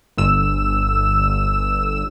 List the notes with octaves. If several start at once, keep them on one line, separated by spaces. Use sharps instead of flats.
G1 E6 E7